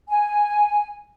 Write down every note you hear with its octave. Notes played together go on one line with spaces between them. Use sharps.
G#5